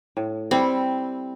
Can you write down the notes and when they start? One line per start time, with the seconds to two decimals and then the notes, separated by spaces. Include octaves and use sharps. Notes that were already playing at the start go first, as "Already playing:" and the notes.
0.17 A2
0.51 G3 C4 E4 A4